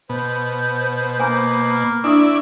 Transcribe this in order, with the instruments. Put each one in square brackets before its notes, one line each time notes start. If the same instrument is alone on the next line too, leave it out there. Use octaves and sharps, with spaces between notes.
[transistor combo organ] B2 [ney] C5
[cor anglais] A#3 [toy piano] G#5
[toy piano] D4 E5 D#6 [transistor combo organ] E4 D5 [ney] C#6